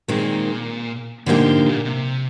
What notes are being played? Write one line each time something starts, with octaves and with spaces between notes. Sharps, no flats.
A#2 D#3 G#3 C4
G#2 D3 F3 A#3 D#4 G4
A#2
G#2
A#2
C3